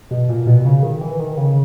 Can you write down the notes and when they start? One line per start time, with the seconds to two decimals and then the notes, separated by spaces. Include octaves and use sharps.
0.11 B2
0.29 A#2
0.47 B2
0.65 C#3
0.83 D#3
1.01 E3
1.19 D#3
1.37 C#3